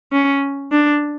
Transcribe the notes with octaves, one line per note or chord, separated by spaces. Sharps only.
C#4
D4